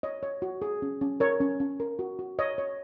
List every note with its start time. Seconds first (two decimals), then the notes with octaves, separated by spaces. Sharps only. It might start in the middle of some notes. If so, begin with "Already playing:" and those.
0.03 C#5 D#5
0.23 C#5
0.42 F#4
0.62 G#4
0.82 C#4
1.01 C#4
1.20 A#4 C#5
1.40 C#4
1.60 C#4
1.80 A#4
1.99 F#4
2.19 F#4
2.39 C#5 D#5
2.58 C#5